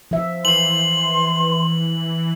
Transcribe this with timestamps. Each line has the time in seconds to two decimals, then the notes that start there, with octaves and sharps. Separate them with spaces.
0.11 F3 E5
0.45 E3 C6 F#7